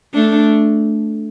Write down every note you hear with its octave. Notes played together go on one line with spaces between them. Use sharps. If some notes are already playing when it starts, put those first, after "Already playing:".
A3 D4